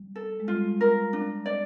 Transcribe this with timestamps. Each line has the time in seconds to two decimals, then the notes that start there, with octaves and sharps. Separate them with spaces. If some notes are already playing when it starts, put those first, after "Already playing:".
Already playing: G3
0.16 A4
0.40 G#3
0.48 G3 F4
0.81 A#4
1.13 D4
1.46 D5